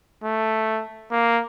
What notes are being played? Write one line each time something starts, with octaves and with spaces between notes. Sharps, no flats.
A3
A#3